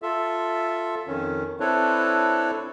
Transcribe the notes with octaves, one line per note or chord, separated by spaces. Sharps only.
F4 A4 E5
F2 D#3 C#4
C4 D4 E4 A4 B4 C#5